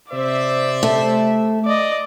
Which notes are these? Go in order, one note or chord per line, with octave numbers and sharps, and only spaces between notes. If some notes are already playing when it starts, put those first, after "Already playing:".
C3 C5 D5 E5
A3
D5 D#5